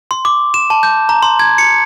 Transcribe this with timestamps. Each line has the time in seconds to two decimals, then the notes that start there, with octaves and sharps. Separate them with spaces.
0.11 C6
0.25 D6
0.54 E7
0.70 A5
0.83 G6
1.09 A#5
1.23 C6
1.39 G#6
1.58 C#7